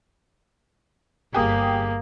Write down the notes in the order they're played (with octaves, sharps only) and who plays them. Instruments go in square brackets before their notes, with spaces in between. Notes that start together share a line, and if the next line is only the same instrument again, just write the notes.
[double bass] G1 [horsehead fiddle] A#3 [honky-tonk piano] G4 G#4 D#6